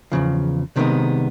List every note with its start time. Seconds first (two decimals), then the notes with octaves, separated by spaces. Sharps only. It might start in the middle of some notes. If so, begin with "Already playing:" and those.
0.12 E2 C#3 F3
0.76 C2 C3 D#3 G#3 B3